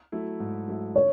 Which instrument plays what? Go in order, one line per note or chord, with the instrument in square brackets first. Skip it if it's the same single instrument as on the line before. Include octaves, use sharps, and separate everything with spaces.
[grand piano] F#3 A3 E4
G#2
F#3 A3 E4
[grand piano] D3 [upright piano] C#5